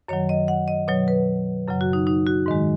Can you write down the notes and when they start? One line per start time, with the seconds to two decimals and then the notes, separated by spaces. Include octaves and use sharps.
0.08 F#2 D#3 F#3 C#5
0.29 D#5
0.48 F#5
0.68 D#5
0.88 B2 F#3 C#5
1.08 B4
1.68 F#2 C#3 F#3
1.81 F#4
1.93 D#4
2.07 D#4
2.26 F#4
2.46 G#2 D#3 G#3